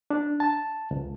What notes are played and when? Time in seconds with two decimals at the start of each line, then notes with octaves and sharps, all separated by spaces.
0.10 D4
0.40 A5
0.91 C#2